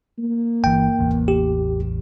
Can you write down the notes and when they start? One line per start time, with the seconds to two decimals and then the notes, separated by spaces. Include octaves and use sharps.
0.18 A#3
0.64 G1 E3 G5
0.99 A1 E2
1.28 G4